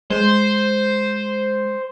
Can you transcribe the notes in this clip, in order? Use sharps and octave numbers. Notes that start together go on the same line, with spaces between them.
G#3 C5